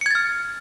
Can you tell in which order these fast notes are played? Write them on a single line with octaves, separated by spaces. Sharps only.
C#7 G#6 A6 F6